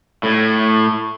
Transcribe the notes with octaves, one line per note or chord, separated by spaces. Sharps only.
A2